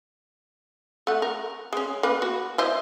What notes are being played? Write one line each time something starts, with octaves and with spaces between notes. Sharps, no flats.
A3 F#5
A#4
G#3 C#4
A#3 B4
F#4
E4 C5 D#5